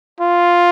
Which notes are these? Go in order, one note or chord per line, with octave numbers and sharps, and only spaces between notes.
F4